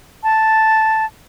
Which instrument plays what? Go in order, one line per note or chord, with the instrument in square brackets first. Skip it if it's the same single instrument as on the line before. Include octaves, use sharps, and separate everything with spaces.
[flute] A5